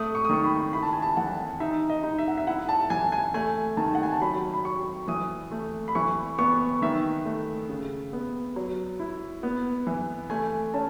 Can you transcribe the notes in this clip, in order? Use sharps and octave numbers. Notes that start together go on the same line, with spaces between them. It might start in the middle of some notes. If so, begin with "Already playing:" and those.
Already playing: A2 A3 D#6
C#6
D#6
D#3 C#6
B5
E4 B5
A5
G#5
A5
E3 F#5
D#4 E5
D#5
D#4
E5
F#5
E5
E4 F#5
A5
E3 G#5
G#5
A3 G#5
D#3 A5
F#5
G#5
A5
F#3 B5
B5
F#3 C#6
E3 D#6
A3
B5
E3 C#6
B3 C#6
D#3 E5
A3
C#3
B3
F#3
E4
B3
E3
A3 G#5
C#4 A5